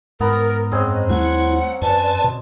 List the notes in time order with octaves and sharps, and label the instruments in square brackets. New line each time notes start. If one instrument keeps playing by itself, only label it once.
[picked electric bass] G#2 [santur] B3 A#5 [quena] A#4
[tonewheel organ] F#2 [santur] C4 C#4 G#4 [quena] D#5
[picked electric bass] D#2 G3 A3 [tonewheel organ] E4 [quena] F#5
[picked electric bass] F#2 [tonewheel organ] B4 D5 G#5 [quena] A5
[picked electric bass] B2